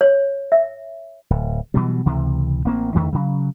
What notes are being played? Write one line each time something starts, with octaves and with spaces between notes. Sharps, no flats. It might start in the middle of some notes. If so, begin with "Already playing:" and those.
C#5
E5
D1
B2 E3 F#3 G3
C#2 C3 E3
A1 A#3 C4
E2 D3 D#3 A3
C#3 F#3